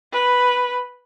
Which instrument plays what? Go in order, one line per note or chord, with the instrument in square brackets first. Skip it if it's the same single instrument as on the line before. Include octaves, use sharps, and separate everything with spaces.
[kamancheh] B4